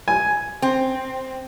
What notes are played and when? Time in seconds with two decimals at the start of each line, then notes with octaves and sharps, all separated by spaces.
0.08 G#5
0.62 C4